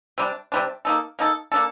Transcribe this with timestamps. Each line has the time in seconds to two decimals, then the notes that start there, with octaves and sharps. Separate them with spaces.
0.18 C3 G3 D4
0.52 C3 G3 D4
0.85 A#3 D#4 A4
1.19 A#3 D#4 A4
1.52 A#3 D4 A4